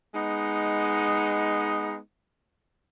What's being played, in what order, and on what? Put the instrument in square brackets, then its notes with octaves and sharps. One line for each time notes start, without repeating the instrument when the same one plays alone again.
[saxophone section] G#3 B3 D#4